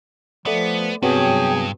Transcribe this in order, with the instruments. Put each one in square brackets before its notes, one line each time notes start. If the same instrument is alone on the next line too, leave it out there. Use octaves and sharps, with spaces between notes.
[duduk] F3 [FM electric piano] A3 D5 [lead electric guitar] B3
[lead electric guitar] G2 [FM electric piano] C3 F#3 B3 [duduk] G#4 [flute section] C#5 G5